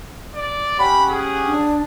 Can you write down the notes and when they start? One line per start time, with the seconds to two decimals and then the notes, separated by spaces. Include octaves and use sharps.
0.35 D5
0.79 C#4 G4 F#5 B5
1.10 G#4
1.46 D4